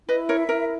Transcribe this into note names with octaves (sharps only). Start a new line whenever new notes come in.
E4 B4 D#5
A#4 C#5 E5
E4 A#4